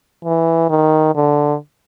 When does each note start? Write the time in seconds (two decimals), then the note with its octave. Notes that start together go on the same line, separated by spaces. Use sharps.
0.24 E3
0.69 D#3
1.15 D3